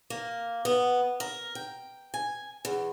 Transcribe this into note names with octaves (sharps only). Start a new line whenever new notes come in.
A#3
B3
A#4
G5
G#5
E2